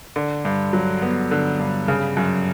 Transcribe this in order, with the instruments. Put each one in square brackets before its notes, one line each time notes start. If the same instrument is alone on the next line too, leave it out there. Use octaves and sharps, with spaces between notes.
[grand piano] D3
G2
F#3
B3
D3
G2
C#3
F#2